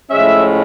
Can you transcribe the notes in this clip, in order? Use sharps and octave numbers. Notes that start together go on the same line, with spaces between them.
A2 F3 G#3 C#4 E5